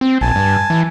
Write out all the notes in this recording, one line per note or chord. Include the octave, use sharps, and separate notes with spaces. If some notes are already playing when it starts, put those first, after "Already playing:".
C4
A#1 G#5 A5
G2
E3